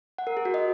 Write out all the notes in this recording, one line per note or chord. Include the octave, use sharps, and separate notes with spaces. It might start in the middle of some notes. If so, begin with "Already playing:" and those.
F#5
A#4
G#4
F#4
D#5